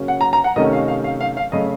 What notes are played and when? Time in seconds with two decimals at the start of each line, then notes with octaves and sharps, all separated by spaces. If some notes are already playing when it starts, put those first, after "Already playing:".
Already playing: C#3 F#3 A#3 C#4
0.08 F#5
0.21 A#5
0.33 A#5
0.44 F#5
0.56 C3 D#3 A3 C#4 D#5
0.73 F5
0.88 F5
1.04 F5
1.21 F5
1.37 F5
1.52 C#3 A3 D#5